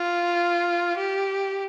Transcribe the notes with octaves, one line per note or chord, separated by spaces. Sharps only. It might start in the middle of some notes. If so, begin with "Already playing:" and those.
Already playing: F4
G4